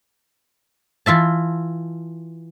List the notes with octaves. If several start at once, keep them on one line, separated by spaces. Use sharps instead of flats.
E3 F4 E5 A5